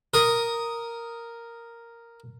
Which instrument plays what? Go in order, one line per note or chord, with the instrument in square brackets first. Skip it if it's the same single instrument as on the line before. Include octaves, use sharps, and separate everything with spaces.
[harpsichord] A#4 D#6